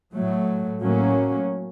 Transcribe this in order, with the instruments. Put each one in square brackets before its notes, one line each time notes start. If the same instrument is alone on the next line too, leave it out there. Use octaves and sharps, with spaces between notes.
[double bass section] A2 F#3 A3
A2 F#3 A#3 C#4